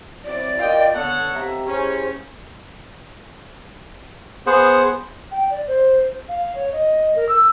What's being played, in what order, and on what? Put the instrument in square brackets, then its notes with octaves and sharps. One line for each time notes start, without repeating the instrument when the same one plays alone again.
[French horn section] F#3 C4 E4 [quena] D5
[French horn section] B2 A#3 [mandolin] F4 D#5 [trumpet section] G5
[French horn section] D3 [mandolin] B3 [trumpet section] A4 C#5 F#5
[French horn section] D#2 C4 G4 [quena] E5 [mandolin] A#5
[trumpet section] C#4 [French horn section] E4 G4 G#4 [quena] C5
[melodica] B3 G#4 C5 F#5
[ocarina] G5
D5
C5
F5
C#5
D#5
A#4
E6